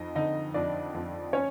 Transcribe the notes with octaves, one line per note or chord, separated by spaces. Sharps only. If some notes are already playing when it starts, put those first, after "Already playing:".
Already playing: F2 D#4 D#5
D3 D#4 D#5
F2 D4 D5
F2
C#4 C#5